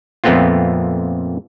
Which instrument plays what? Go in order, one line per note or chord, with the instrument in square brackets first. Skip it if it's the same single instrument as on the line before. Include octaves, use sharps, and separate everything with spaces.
[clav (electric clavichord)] F2 A#2 A3 B3 C4 F4